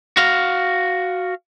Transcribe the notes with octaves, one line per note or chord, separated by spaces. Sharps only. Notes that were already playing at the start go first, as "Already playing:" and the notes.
F#4 F5